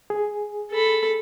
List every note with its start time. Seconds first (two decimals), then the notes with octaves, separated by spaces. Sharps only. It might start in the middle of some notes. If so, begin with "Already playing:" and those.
0.10 G#4
0.71 A4 B5